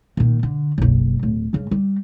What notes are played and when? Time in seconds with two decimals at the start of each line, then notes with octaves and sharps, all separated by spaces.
0.17 A#2 D#3
0.43 D3
0.78 F#1 B1
1.23 D1
1.53 G2 C#3
1.71 G3